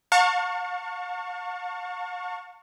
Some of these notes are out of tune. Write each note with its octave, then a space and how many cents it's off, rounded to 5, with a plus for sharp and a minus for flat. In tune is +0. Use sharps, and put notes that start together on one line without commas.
F5 +45 A5 +40 C#6 +0